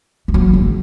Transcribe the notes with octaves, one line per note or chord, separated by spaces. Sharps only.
E3
F#3
G#2